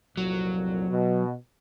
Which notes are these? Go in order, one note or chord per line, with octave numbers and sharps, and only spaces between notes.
C2 F2 A#2 F#3
B2